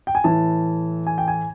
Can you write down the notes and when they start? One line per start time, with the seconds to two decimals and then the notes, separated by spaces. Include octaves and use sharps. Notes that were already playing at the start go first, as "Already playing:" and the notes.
0.07 G5
0.15 G#5
0.24 A2 E3 A5
1.07 G#5
1.18 G5
1.28 G#5